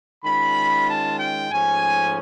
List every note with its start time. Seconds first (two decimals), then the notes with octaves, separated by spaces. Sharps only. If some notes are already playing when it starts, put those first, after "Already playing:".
0.23 D#3 G#3 C#4 F4 B5
0.87 A5
1.19 G5
1.50 G#2 F3 A3 C#4 G#5